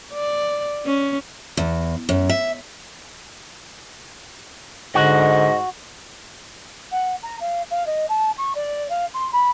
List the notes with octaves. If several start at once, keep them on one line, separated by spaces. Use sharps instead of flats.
D5
C#4
E2
F#2
E5
G#2 D3 F#4 D#5
F#5
A#5
F5
F5
D#5
A5
C#6
D5
F5
C6
B5